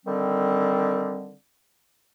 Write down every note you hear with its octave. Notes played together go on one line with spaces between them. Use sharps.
D3 D#3 G3 C4